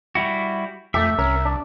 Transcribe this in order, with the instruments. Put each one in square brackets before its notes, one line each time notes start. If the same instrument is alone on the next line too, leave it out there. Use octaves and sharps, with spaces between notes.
[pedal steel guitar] G3 E4 F#4
[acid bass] F2 [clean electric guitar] A3 G4 [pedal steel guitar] E5
[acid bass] C2 [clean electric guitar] C#4 A#4
[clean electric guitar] D4